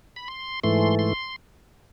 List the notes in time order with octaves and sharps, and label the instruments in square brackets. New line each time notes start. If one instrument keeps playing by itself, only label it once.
[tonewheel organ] B5
C6
G#2 E3 A3 C6
C6